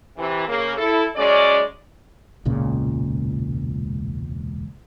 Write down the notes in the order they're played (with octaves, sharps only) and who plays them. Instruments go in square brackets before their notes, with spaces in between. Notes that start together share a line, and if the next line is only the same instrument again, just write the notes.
[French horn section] C3 E3
C#3 A#3
E4 A4
F#2 G#3 C#4 D5
[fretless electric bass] E1 C#2 A#2 C#3